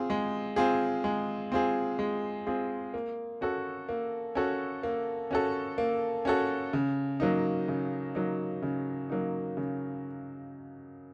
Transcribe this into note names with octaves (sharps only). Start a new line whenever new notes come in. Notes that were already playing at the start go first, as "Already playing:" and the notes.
Already playing: C4 F4 G#4
G#3
C4 F4 G#4
G#3
C4 F4 G#4
G#3
C4 F4 G#4
A#3
C#4 F#4 A4
A#3
C#4 F#4 A4
A#3
C#4 F#4 A4
A#3
C#4 F#4 A4
C#3
F#3 A#3 D#4
C#3
F#3 A#3 D#4
C#3
F#3 A#3 D#4
C#3